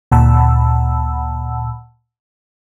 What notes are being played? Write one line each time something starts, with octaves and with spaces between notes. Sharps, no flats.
D2 A#2 F#5 A5 B5 E6